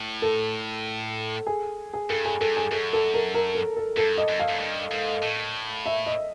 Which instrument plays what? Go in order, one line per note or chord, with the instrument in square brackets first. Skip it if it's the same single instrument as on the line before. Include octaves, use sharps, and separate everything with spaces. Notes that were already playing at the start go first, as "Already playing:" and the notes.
Already playing: [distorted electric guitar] A2
[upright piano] A4
G#4
G#4
[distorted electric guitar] G2 [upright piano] A4
[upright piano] G#4
[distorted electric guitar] G2 [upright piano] A4
[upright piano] G#4
[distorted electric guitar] F#2 [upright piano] A4
[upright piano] A4
A#4
A#4
A4
A4
[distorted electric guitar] G2 [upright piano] A4
[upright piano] D#5
[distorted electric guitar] F#2
[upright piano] F5
[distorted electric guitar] F#2
G2
G#2
A2
[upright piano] E5
D#5